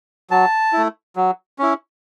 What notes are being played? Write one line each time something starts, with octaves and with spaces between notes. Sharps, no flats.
F#3 A5
A3 E4
F#3
C#4 E4